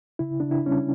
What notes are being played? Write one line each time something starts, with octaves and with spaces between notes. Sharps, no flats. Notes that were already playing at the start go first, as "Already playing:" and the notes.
C#3 E4
C#3 D4
E4
G3 C#4